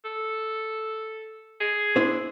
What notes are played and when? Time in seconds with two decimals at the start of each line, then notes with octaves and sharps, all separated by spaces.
0.05 A4
1.60 G#4
1.96 D4 E4 C5